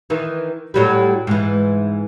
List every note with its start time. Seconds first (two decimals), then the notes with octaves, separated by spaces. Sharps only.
0.10 D#3 E3
0.74 A2 F#3 G3
1.27 G#2 E3